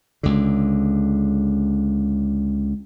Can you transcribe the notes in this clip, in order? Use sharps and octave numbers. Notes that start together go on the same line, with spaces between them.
C#2 D3